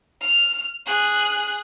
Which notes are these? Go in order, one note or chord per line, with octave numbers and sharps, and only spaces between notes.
F6
G#4 F#6